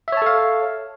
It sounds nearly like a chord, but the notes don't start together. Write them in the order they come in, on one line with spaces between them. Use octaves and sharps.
E5 C#5 A5 A4 F5